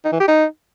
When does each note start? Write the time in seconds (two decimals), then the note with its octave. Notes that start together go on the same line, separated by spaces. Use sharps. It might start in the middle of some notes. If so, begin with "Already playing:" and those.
0.04 D#4
0.12 E3
0.20 G4
0.28 D#4